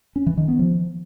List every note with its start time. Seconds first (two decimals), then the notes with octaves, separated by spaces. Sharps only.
0.16 C#4
0.27 E3
0.37 D#3
0.48 B3
0.59 F3